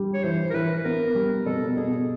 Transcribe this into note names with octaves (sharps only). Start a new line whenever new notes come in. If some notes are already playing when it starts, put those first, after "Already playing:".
Already playing: G3
C#5
E3 C5
A#4
E3 B4
B3 A#4
G3
B2 A4
B2 G#4